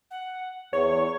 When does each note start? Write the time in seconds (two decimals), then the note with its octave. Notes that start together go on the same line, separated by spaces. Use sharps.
0.11 F#5
0.73 E2 C#5 C#6